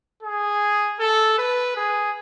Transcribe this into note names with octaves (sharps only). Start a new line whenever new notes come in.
G#4
A4
B4
G#4